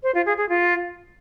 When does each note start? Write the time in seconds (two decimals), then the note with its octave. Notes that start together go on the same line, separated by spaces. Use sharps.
0.03 C5
0.15 F4
0.26 G#4
0.38 G#4
0.49 F4